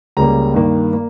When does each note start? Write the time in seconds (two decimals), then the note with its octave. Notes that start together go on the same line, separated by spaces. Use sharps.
0.17 C#2 C#3 G3 A#3 A#5
0.54 G2 D#3 A#3
0.93 A#3